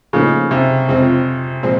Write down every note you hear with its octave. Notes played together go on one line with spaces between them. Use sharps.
A2 C#3 F3 A#3 D#4
C3
F2 C#3 F3 G#3 C4
A#2 F3 G#3 C4